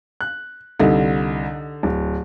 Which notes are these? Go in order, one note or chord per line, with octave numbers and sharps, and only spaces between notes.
F#6
C2 D3 D#4
D1